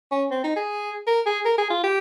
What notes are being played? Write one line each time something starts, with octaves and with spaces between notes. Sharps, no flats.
C#4
C4
D#4
G#4
A#4
G#4
A#4
G#4
F4
G4